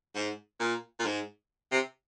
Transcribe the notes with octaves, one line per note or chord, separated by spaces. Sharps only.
G#2
A#2
A#2
G#2
C3